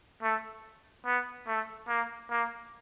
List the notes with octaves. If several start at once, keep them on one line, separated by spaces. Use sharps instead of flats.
A3
B3
A3
A#3
A#3